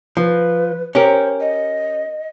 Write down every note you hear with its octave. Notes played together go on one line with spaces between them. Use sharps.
F3 B4
C#4 G4 A#4 C5
D#5